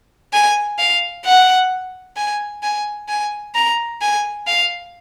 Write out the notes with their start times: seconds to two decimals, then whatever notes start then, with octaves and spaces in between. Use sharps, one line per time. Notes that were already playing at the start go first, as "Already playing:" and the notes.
0.33 G#5
0.79 F5
1.25 F#5
2.17 G#5
2.63 G#5
3.09 G#5
3.55 A#5
4.02 G#5
4.48 F5